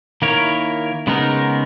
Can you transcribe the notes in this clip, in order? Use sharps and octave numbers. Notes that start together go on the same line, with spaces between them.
D#3 A#3 E4 A#4 C#5
C#3 G#3 B3 D#4 A#4